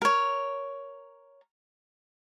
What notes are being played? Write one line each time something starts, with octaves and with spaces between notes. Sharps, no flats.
A#4 C#5